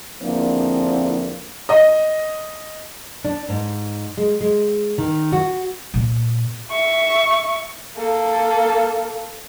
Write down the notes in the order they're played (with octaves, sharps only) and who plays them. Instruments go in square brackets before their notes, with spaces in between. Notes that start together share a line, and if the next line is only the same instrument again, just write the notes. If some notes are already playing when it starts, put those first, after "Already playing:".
[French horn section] E2 D3 F3 A#3 C4 D4
[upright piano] D#5
[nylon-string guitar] D4
G#2
G#3
G#3
D#3
F#4
[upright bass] A#2
[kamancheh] E5 C#6
A#3 A4